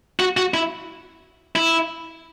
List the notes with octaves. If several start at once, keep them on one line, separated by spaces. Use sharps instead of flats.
F#4
F#4
E4
E4